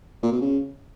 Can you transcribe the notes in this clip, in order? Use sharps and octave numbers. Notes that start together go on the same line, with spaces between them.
A#2
B2
C#3